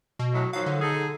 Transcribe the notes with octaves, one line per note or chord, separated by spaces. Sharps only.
B2
A2 F#3
D#3 F3 F#3 F5
D3
D#4 G#4 A4